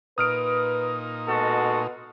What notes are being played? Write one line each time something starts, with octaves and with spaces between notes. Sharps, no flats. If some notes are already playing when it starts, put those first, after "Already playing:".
A#2 D#4 B4 D#6 F6 D7
B2 G#3 F#4 A4